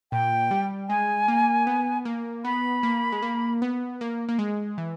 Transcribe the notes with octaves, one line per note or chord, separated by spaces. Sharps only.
A#2 G5
G3
G#3 G#5
A#3
B3
A#3
B3 B5
A#3
G#3
A#3
B3
A#3
A#3
G#3
E3